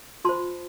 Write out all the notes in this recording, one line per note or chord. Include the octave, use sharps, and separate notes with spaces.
F4 C5 A5 C6